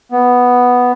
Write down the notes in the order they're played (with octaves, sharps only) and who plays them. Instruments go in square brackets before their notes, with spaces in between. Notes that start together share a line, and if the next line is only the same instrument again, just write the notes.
[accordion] B3